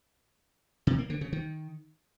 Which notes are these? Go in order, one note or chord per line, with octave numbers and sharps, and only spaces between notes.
C3
A#3
D3
C#3
D#3